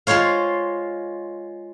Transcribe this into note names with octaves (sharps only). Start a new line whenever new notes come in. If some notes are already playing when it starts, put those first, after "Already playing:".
G#3 F4 C5 C#5 F5